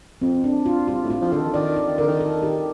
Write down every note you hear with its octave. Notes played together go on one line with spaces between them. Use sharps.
F2 C4
D4
F4
G2 F4
A2
F4
F3
D3 A4
D#3
D#3 D5
D5
D#3
D3 A#4
D#3
A4
G4